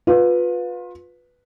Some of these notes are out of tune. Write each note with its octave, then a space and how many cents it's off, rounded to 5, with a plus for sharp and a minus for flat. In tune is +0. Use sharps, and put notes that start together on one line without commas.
F4 +30 B4 +0